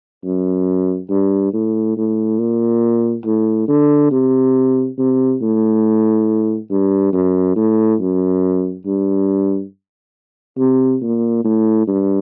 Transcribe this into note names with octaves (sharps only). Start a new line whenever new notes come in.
F#2
G2
A2
A2
A#2
A2
D3
C3
C3
A2
G2
F#2
A2
F#2
G2
C3
A#2
A2
G2